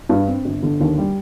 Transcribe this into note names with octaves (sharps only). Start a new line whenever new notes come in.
G2
C4
G1
D3
D#2
G3